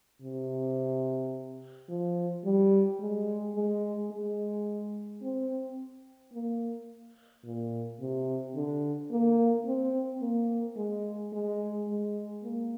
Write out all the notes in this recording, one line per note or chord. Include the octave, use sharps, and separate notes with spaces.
C3
F3
G3
G#3
G#3
G#3
C4
A#3
A#2
C3
D3
A#3
C4
A#3
G#3
G#3
G#3
A#3